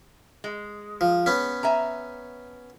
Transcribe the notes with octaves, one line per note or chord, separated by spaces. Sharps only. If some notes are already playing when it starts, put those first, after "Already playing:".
G#3
F3
B3 C#4
E5 G#5 A#5